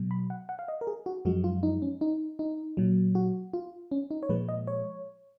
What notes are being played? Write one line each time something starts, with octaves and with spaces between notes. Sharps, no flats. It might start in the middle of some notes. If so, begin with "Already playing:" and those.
Already playing: B2 F#3
B5
F#5
F#5
F5
D#5
A#4
G#4
F#4
F#2 F3 G#3 F#4
F4
D#4
C#4
D#4
D#4
A#2 F#3
F#4
F4
C#4
D#4
C#5
A#2 F3 G#3 B4
D#5
C#5